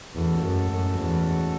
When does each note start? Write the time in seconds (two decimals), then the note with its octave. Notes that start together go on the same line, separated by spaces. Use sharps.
0.15 E2 A2 G#3 C#4 F#4 A4
0.43 F#2
0.71 F#2
0.99 E2